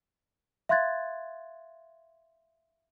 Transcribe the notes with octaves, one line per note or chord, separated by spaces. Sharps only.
E5 F5 C6 F#6 G#6 A6